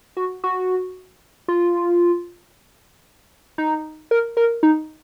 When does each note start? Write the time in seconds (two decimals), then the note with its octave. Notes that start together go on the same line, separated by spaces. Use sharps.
0.17 F#4
0.44 F#4
1.48 F4
3.58 D#4
4.11 A#4
4.37 A#4
4.63 D#4